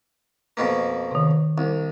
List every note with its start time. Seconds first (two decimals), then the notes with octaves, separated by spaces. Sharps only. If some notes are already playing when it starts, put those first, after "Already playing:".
0.57 F2 B2 A#3
1.11 C3 D#3
1.58 C2